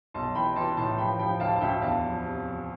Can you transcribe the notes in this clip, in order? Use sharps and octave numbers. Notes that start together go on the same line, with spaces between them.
B1 A5 C6
E3 G5 B5
E3 A5 C6
A2 A5 C6
F3 G5 B5
F3 G5 B5
D2 F5 A5
A5
D2 E5 G5
E2 F5 A5
F3
C3
F3